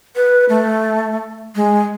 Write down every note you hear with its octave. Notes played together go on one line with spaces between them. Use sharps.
B4
A3
G#3